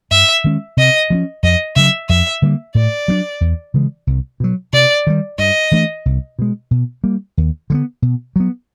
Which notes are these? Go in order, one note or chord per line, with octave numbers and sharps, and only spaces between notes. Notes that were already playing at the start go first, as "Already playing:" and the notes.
G2 E5
D#3 G#3 C#4
C3 D#5
F3 A#3 C#4
F2 D#5
C#3 F#3 E5
F2 E5
D3 G3 A#3
A2 D5
F#3 B3 D4
E2
C#3 E3 G#3
C2
B2 F#3
C3 D5
D#3 G3
G2 D#5
E3 A3 D4
C2
B2 G#3
B2
G3 A#3
D#2
D3 G3 B3
B2
F#3 B3